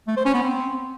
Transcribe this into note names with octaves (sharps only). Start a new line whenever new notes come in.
A3
C5
C#4
B3
C4